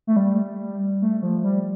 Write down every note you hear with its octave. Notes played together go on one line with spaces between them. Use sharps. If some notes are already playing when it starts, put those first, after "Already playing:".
A3
G3
A3
F3
G3